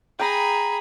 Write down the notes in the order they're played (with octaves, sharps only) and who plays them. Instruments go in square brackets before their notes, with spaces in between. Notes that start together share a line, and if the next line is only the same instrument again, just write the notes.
[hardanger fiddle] G#4 B5 [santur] G5 A#5